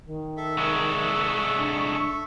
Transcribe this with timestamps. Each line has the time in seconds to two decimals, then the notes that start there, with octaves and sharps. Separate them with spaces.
0.05 D#3
0.37 A4 E5
0.57 C2 G#3 C#6
1.58 D4